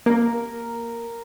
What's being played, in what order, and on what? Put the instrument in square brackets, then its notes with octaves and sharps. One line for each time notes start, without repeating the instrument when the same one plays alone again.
[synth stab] A#3 [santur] A#4